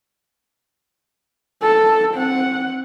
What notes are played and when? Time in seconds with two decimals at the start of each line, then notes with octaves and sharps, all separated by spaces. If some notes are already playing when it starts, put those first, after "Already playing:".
1.62 A4
2.15 C4 F#5